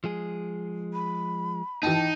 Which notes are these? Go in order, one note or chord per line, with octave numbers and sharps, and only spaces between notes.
F3 G#3 G#4
B5
E3 D#4 G5 A5